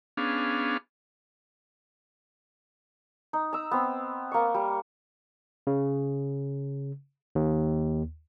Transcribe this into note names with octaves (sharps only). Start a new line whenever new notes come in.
B3 C#4 D4 G#4 F5
D#4
A#5 E6
B3 C4
A#3 C#6
G3
C#3
D#2